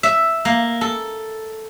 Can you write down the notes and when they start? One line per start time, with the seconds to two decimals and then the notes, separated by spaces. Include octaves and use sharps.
0.03 E5
0.45 A#3
0.81 A4